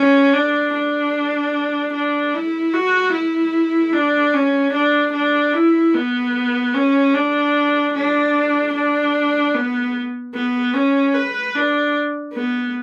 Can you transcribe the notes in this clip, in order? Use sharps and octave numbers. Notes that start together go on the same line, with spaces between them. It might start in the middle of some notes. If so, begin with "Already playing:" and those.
Already playing: C#4
D4
D4
D4
E4
F#4
E4
D4
C#4
D4
D4
E4
B3
C#4
D4
D4
D4
B3
B3
C#4
B4
D4
B3